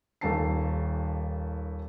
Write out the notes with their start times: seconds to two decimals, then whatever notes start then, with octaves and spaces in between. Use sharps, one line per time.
0.21 D#1 D#2 A4 A5 C7